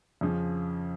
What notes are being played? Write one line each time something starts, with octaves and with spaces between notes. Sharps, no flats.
F2 C#3 F3